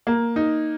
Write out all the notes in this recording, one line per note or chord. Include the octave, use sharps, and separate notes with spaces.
A#3
D#4